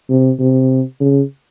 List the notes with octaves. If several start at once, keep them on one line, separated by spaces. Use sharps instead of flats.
C3
C3
C#3